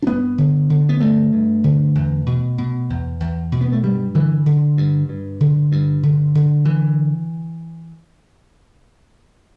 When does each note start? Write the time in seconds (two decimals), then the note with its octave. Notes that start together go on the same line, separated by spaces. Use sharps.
0.02 D4
0.07 G2 B3
0.38 D3
0.70 D3
0.89 B3
1.00 G2 A3
1.33 G2
1.64 D3
1.95 E2
2.26 B2
2.58 B2
2.90 E2
3.20 E2
3.52 B2
3.61 B3
3.72 A3
3.83 G2 G3
4.15 D3 E3
4.46 D3
4.77 G2
5.09 G2
5.40 D3
5.72 G2
6.03 D3
6.35 D3
6.65 E3